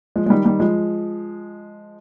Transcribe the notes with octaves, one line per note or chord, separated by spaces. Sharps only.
F3 G#3
G#3
D#3 G3
D#3 G3
F3 G#3